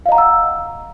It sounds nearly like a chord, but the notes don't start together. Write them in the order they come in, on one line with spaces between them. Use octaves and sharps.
F5 D#5 A#5 F#5 E6